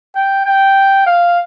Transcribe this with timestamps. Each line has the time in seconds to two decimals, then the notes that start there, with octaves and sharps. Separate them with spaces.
0.15 G5
0.46 G5
1.06 F5